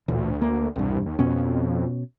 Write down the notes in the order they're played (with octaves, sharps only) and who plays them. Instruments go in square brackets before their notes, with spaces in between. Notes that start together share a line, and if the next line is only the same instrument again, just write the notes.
[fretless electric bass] A1 A#2 [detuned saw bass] D2
[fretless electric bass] A#3
[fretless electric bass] E1 G2 [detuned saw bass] C2
[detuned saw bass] D#2
[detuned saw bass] F2 [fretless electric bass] B2 B3 C#4